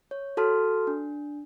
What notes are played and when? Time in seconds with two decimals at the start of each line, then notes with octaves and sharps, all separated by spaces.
0.11 C#5
0.37 F#4 A4 A5 C6 F6
0.87 D4